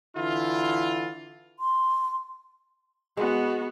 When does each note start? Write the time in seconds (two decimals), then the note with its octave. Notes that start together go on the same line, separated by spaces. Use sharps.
0.16 D3 E3 E4 F4
1.60 C6
3.17 G#3 B3 F#4